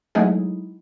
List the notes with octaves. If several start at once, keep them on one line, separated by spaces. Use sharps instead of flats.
F#3 G#3 A3 D#4 E4 G#4